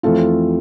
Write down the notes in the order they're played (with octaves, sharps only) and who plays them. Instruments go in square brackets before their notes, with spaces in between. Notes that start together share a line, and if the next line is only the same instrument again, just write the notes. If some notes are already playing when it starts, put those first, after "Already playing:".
[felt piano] F2 E3 A3 C4 F4 A4